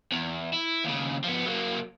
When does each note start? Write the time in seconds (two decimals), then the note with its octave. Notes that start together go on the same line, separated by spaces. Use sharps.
0.12 E2
0.54 E4
0.85 D#2 C#3
1.24 F3 B3
1.46 F#3 A#3